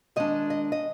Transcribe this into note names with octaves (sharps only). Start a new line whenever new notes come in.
D#3 G#3 D4 D#5
D#5
D#5